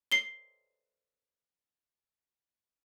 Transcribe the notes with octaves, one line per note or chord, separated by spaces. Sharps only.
C7 G7